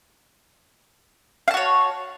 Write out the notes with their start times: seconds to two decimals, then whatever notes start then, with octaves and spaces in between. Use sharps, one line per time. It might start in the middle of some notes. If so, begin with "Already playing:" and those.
1.48 F5
1.51 A5
1.54 F#4
1.57 C#5